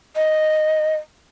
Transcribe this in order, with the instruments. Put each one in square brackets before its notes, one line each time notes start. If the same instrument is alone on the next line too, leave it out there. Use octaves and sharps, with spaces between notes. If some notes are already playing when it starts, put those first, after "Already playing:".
[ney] D#5